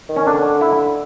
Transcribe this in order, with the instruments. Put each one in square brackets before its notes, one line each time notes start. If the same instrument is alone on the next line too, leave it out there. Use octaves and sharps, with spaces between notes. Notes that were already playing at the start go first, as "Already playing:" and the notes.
[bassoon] D#3
[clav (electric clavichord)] C#4
[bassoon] D3 [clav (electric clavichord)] D4
[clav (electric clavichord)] E4